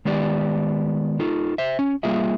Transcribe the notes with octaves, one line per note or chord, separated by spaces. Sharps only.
D#3 G#3 B3 G4 D5
D#4 F4 A4
C5 E5
C#4
G3 A#3 F4 G#4 E5